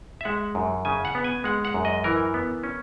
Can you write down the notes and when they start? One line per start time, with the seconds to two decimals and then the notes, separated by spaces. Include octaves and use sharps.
0.21 E5
0.25 G#3 F#5
0.55 F#2
0.85 C#3 G#5
1.05 F#5
1.15 B3
1.24 G#5
1.44 G#3 F#5
1.65 F#5
1.74 F#2
1.85 D#5
2.04 E3 A#4
2.34 B3
2.64 C#4